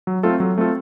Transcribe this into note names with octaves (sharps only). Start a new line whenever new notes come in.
F#3
A3 C4 F4 A4
F#3
A3 C4 F4 A4